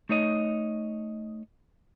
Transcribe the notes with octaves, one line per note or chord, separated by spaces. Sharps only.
A3 D#4 C#5 D#5